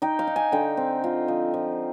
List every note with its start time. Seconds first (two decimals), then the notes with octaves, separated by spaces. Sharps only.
0.02 D#4 G5
0.19 F5
0.27 D#4
0.36 G#5
0.52 D3 G5
0.77 C4
1.04 F4
1.28 F3
1.54 F3